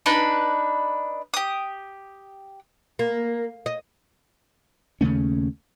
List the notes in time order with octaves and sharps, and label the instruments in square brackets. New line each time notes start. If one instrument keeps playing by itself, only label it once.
[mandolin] D4 D#4 B4
G4 D#6
[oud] A#3
D#5
[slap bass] D#2 C#3 A3 C#4